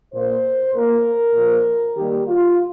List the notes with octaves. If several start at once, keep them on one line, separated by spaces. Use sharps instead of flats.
A#2 A#3 C5
A#2 A#3 A#4
A#2 F3 A#3
D#3 G3 A#3 G4
F4